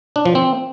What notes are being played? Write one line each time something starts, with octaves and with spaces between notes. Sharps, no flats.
D4
F3
C4